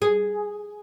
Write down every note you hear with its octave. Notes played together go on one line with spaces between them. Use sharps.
G#4